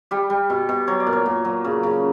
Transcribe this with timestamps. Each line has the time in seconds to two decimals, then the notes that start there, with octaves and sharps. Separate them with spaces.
0.11 G3 G4
0.30 G3
0.50 B2
0.69 B2
0.87 F#3 C#5
1.00 D5
1.07 A#2
1.13 C#5
1.26 A#2
1.45 F#3
1.64 C#3
1.83 C#3